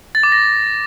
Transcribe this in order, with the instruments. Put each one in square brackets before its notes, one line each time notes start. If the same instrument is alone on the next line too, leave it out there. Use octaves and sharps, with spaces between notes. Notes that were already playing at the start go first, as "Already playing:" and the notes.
[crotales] A6
D6
A#6